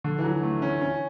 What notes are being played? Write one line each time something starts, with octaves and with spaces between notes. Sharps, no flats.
D3
E3
F#3
A3
C#4
C#4